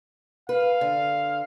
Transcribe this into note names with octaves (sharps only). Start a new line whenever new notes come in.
B4 F5
D3